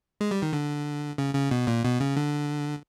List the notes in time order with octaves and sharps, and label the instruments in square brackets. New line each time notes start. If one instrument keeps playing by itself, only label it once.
[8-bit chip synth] G#3
G3
D#3
D3
C#3
C#3
B2
A#2
B2
C#3
D3